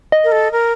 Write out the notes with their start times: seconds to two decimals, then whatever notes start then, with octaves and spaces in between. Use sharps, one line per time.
0.12 D#5
0.24 A#4
0.32 A4
0.52 A#4